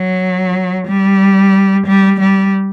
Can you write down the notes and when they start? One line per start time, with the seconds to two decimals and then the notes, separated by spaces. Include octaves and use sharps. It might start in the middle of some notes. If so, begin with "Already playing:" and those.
Already playing: F#3
0.87 G3
1.86 G3
2.20 G3